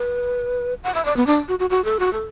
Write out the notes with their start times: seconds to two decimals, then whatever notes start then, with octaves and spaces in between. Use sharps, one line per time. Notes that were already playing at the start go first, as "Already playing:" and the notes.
Already playing: B4
0.83 F#5
0.95 E5
1.05 D5
1.17 B3
1.27 D4
1.48 F#4
1.59 F#4
1.70 F#4
1.85 A4
1.99 F#4
2.13 A4